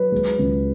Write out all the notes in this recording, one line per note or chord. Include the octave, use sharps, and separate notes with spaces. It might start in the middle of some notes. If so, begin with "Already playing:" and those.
Already playing: F#3 B4
G#3
C#2